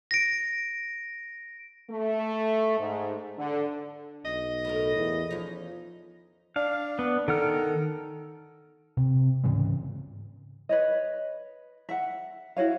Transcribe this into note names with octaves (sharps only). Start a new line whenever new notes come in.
A#6 D7
A3
G#2
D3
B1 D#5
A2 A4 A#4
E2
E2 F3 C#4 D#4
D4 F5
B3
D#3 A4 F#5 F6
C3
G#2 C#3 E3 G#3
B4 C#5 D#5
E5 F#5
E4 F#4 C#5 F5